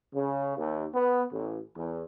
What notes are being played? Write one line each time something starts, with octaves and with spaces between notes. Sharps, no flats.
C#3
D#2
B3
A1
E2